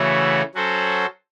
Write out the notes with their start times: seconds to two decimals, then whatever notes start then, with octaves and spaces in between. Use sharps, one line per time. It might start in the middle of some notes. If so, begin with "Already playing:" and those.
Already playing: C#3 E3 A3 C#4 F#4
0.54 F#3 C#4 F#4 A4 C5